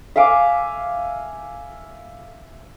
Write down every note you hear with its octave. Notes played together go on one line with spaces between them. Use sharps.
E5 F5 G#5 D6